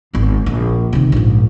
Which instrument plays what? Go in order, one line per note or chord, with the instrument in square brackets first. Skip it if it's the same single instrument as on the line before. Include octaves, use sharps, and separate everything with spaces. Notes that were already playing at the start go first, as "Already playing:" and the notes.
[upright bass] G#1 B3
A#1
C3 D#3
A#1 G#2